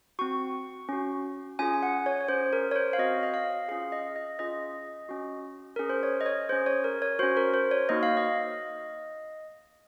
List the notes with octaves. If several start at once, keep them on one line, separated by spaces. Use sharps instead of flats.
C4 F#4 C#6
C#4 F#4
C#4 F4 G#4 G#5
G#5
F#5
C#5
C#5
C#4 G#4 C5
A#4
C#5
C5
F5
C4 F#4 D#5
D#5
F5
C#4 F4 G#4 F5
D#5
D#5
C#4 F4 G#4 D#5
C#4 F#4
C#4 G#4 A#4
C5
C#5
D#5
C#5
C#4 G#4 C5
C#5
A#4
C#5
C#4 F#4 C5
A#4
C5
C#5
A#3 D#4 F#4 D#5
F5
D#5